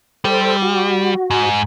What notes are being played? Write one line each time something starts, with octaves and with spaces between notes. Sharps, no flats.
G3 A4 C5
F#4
G#2